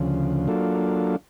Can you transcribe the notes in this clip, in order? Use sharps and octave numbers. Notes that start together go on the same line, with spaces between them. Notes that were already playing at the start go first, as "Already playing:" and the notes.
Already playing: D2 C#3 F3
F#3 A#3 D4 F4 A4